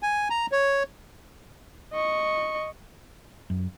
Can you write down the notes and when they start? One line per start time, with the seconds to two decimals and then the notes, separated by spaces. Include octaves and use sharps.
0.03 G#5
0.30 A#5
0.52 C#5
1.93 D#5 C#6
3.50 F#2